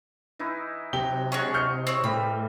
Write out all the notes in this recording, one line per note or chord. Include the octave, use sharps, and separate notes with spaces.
E3 D#4 E4
C3 F#3 G4 G7
G#3 C#4 D4 F#4 G#4
F6 G6 C#7
C4 C#5
A2 E3 G3 C4 B5